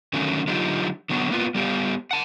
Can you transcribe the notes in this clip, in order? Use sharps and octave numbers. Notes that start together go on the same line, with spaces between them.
D3 D#3 F#3 A3 C#4
D3 F#3 D#4 F4 G4
D3 F#3 B3 F#4
A#3 B3 F4
G3 B3 G4 F5
F#5 A5